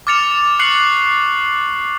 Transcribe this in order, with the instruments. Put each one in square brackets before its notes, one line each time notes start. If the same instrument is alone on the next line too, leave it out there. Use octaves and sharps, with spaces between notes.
[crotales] D6 F6 A6 C#7 F7
C#6 F#6 C7 C#7 F#7